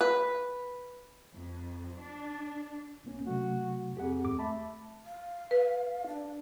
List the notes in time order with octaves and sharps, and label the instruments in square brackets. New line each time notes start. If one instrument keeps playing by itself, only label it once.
[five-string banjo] B4
[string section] F2
D4
[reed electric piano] C2 A#3 C#4
[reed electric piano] C3 F#3 A3 [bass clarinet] F#4
[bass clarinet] F2 [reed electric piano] G4 G#4 F#5
[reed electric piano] D#2 G#2 D6
[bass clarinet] A3 [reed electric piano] A5 B5
[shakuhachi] F5
[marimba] B4
[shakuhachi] D4